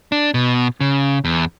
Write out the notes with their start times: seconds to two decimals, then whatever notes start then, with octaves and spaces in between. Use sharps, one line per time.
0.12 D4
0.34 B2
0.81 C#3
1.25 E2